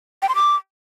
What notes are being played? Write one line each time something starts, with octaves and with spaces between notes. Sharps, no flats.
G5
C6
D6